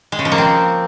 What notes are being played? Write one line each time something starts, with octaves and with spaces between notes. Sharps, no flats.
G#3
C#3
F3
A#3
C4